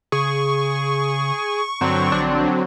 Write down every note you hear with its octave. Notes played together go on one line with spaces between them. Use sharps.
C#3 G#4 C#6
G2 D3 F#3 C4
A#1 D4